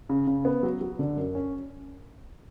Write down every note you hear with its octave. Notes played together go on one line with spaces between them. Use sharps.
C#3
C#3
B3
F#3
F#3
D3
F#2
C#4